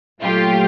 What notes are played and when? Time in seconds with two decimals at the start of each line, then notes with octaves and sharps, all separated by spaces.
0.22 A#2 F#3 A3 F4 G4